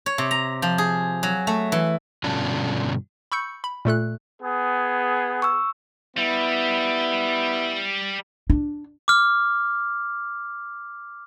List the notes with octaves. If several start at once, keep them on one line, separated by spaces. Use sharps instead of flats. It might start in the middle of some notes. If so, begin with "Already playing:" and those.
C#5
C3
A#5
F3
G#4
F#3
A3
E3
G2 B2 D3 C#4 D4 F4
B5 C#6 E6 G6 C#7
B5
A#2 A3 A4 F#6
B3 G#4
C#6 E6
G3 B3 E4
D4
D6 F6